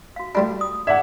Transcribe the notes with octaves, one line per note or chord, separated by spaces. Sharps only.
F#4 F5
A2 G3 D4 F4 F#4
D#6
G#4 D5 E5 F#5